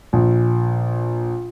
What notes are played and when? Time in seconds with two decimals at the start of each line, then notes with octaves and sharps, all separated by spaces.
0.13 A#1